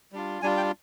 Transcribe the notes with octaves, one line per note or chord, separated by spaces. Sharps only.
G3 D4 F4
G3 D4 F4 G#5
G5